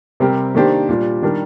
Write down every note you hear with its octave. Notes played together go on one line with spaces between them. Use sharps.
C3 G3 C4 G4 A#4
D#3 A#3 D4 G4 C5
A#2 G3 D4
D#3 G3 D4 G4 A#4